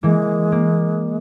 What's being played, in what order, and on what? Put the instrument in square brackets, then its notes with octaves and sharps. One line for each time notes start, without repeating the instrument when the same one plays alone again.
[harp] E3 A#3 [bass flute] G#3
[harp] A#3